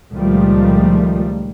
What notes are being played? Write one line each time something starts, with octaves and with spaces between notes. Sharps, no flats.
C#2 A#2 D#3 F3 G3 A3